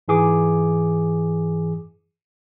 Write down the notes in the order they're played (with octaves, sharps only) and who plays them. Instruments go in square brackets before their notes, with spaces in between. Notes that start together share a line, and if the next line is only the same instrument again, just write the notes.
[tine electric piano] G#2 E3 G#4 D6